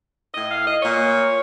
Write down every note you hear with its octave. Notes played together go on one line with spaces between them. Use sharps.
A2 D#5
F5
D#5
A#2 C#5